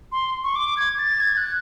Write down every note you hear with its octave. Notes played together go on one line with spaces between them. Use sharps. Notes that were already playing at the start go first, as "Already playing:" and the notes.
C6
C#6
D6
G#6
A6
G#6
F#6